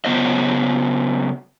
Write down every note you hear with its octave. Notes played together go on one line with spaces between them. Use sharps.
C#3 F#3 B3 C5 D#5